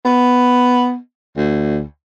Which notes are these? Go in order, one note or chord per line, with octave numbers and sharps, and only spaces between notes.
B3
D2